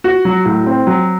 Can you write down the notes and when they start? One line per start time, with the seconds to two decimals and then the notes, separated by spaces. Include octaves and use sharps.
0.04 F#4
0.25 F#3
0.45 A2
0.66 C4
0.87 F#3